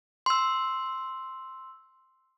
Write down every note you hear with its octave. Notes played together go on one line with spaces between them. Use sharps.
C6 E6